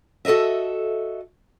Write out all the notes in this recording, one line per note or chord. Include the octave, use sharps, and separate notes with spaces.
F#4 A4 B4 D#5 E5